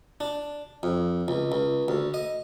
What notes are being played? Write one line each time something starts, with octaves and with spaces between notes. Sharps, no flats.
D4
F2
C#2
C#2
D2
D#5